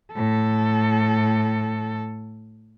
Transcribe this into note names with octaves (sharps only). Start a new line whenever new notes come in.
A2 A4